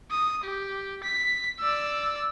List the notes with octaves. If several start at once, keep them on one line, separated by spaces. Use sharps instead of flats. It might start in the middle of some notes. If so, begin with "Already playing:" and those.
D#6
G4
B6
D5 E6